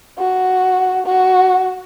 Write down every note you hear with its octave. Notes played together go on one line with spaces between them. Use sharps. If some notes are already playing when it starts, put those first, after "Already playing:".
F#4
F#4